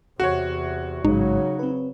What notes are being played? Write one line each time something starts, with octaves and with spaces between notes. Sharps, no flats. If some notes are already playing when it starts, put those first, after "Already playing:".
E2 C3 F#4 C#5
A1 G#2 C#3 F#3 G#3 D#4
C4 B4